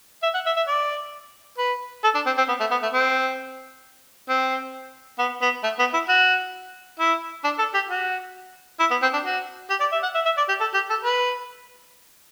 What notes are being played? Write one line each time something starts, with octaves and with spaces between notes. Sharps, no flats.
E5
F#5
E5
E5
D5
B4
A4
D4
C4
C4
B3
A3
B3
A3
C4
C4
B3
B3
A3
B3
E4
F#4
E4
D4
A4
G4
F#4
E4
B3
C4
D4
F#4
G4
D5
E5
F#5
E5
E5
D5
G4
A4
G4
A4
B4